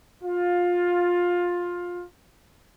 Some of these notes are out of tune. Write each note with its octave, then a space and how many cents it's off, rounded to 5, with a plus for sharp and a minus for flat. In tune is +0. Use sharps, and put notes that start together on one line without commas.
F4 +15